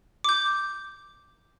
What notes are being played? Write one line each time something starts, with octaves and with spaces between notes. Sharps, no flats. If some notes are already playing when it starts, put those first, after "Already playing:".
D6 G6